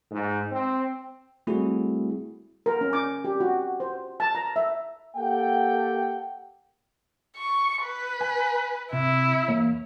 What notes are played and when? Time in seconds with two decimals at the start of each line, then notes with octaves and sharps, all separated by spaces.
0.11 G#2
0.52 C4
1.47 G3 A3 C4 E4 F#4 G#4
2.66 A#4
2.81 C#4
2.93 D6
3.24 G4
3.40 F#4
3.80 C5
4.20 A5
4.35 A#5
4.56 E5
5.16 A#3 G4 A4 F#5 G5
7.37 C#6
7.84 B4
8.21 G#5
8.93 C3 E4
9.48 E2 A#3 C#5